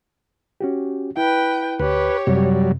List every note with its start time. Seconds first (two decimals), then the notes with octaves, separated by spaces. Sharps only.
0.61 C#4 F#4 G4
1.17 E4 B4 G5
1.80 D2 G4 B4 C#5
2.27 F#2 C3 F#3 G3